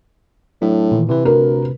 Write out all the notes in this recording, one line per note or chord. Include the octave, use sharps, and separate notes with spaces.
A2 F#3 D4
A#2 D#3 E3
C3 E3 B4
D2 A#4